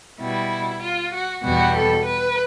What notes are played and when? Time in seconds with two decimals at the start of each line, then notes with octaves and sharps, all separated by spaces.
0.19 B2 G3 E4
0.82 F4
1.13 F#4
1.43 E2 B2 G3 F#4
1.74 A4
2.05 B4